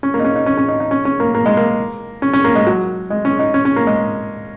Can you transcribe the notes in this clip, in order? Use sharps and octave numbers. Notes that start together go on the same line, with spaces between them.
C#4
A#3
D#4
C#4
D#4
C#4
C#4
D#4
D#4
C#4
C#4
A#3
A#3
G#3
A#3
C#4
C#4
A#3
G#3
F#3
G#3
C#4
D#4
C#4
C#4
A#3
G#3